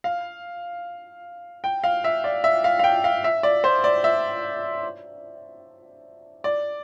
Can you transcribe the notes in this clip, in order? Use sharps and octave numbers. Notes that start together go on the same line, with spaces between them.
F5
G5
F5
E5
D5
E5
F5
F5
G5
F5
E5
D5
C5
D5
E5
D5